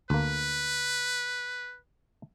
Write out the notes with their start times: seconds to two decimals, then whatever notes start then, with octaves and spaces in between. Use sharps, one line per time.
0.10 D2 A#3 B4